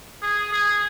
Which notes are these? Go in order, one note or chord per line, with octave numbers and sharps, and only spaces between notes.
G#4
G#4